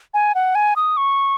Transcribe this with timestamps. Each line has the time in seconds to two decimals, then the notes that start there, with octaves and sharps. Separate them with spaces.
0.14 G#5
0.35 F#5
0.55 G#5
0.76 D#6
0.97 C#6